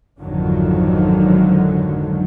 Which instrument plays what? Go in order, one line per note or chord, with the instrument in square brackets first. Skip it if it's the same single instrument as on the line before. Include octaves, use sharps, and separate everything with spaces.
[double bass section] G#1 F2 D3 D#3 F3 F#3